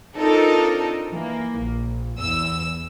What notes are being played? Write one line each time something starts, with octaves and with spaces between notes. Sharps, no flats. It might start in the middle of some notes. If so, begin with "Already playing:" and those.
C4 D4 D#4 F4 A4 A#4
E3 A#3
A#1
E2 E6